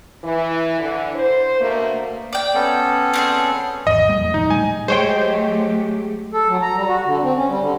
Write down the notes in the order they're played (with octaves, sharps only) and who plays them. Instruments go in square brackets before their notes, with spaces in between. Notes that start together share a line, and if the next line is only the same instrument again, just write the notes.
[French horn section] E3
D3 E3
C5
B2 D3 A3 A#3
[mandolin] D5 G5
[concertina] B3 C#4 A4
[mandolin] C4 F#4 G#4
[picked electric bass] G#1 E2 [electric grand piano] D#5
[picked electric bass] A#2 G3 A#3
F2 A2
[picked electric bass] A1 D2 [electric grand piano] D#4
[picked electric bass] A#2 G3 G#3 [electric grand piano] G#5
[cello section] F#3 A3 G4 [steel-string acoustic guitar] G#3 [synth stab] C5 C#5 G5
[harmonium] A4
F#3
A#5
G3
F#4
D3
C4
C#4
G3
D3